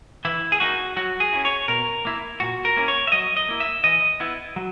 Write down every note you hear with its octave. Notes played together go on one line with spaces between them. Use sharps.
E3 E4
G#4
A#3 D#4 F#4
F#3 F#4
G#4
C#4 E4
C#5
B2 A#4
A#3 E4
A#2 F#4
A#4
A#3 C#4 E4
C#5
E5
F#3 D#5
D#5
A#3 E4
E5
E3 D#5
B3 E4
F#3